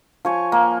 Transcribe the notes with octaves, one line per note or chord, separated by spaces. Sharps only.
F3 C#5 G#5
A#3